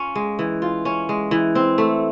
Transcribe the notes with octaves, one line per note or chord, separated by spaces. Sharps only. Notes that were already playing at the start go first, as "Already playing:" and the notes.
Already playing: C#4 F4
G#3
E3
F4
C#4
G#3
E3
C4
A3